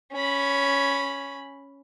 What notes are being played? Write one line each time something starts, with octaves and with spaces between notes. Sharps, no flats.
C#4 B5